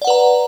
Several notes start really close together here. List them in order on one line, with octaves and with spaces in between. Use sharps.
D5 F#5 B4 A#5